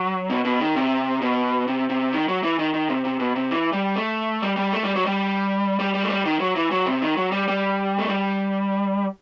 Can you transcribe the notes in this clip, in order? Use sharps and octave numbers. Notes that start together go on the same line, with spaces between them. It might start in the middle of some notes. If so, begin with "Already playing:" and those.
Already playing: F#3
B2
B2
D#3
C3
B2
C3
C3
D#3
F#3
E3
D#3
D#3
C3
C3
B2
C3
E3
G3
A3
G3
G3
A3
G3
F#3
G3
G3
G3
A3
G3
D#3
F#3
E3
F#3
C3
D#3
F#3
G3
G3
A3
G3